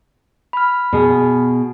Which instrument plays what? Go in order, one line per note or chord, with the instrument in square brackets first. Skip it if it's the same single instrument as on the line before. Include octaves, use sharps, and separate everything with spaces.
[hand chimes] B5 F6
[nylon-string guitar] B2 G#4